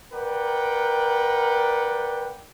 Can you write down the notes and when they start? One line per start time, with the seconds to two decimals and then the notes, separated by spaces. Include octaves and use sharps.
0.13 A#4 B4 D5 F#5 G5